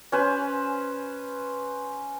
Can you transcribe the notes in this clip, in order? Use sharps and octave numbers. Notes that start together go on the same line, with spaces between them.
C#4 B4 C5